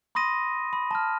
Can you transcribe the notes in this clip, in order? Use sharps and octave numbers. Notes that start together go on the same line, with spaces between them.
B5 C6 D#6 A#6 D#7
B5
A5 B5 F6